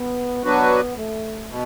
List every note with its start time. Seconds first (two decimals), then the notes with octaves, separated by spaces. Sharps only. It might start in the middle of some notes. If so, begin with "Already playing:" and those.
Already playing: B3
0.44 F#3 B3 D4 F#4 B4
0.96 A3
1.49 B2